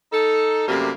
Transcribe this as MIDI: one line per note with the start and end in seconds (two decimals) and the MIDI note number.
0.12 0.67 63
0.12 0.67 69
0.68 0.91 42
0.68 0.91 48
0.68 0.91 55
0.68 0.91 57
0.68 0.91 58